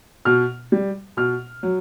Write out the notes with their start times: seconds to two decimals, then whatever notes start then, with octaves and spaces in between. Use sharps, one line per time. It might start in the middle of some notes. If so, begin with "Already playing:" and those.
0.25 B2 F6
0.72 G3
1.17 B2 F6
1.63 F#3